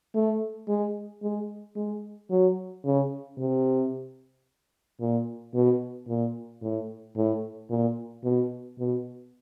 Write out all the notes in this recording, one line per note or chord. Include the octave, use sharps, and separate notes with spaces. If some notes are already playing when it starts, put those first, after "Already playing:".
A3
G#3
G#3
G#3
F#3
C#3
C3
A#2
B2
A#2
A2
A2
A#2
B2
B2